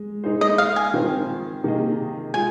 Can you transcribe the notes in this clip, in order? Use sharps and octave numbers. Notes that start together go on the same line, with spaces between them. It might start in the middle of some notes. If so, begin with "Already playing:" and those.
Already playing: G#3
G#3 D#4 G#4 C5
D#5
F5
G#5
D#3 C4 F4 C5
C3 D#3 A#3 G#4 D#5
G#3 F4 G#5